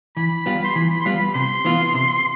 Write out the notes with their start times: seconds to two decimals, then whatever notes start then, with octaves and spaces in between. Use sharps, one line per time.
0.17 E3 B5
0.46 G3 B3 F4
0.65 C6
0.76 E3 B5
0.90 B5
1.01 C6
1.06 G3 B3 F4 B5
1.19 B5
1.34 C3 C6
1.65 E3 B3 F4
1.94 C3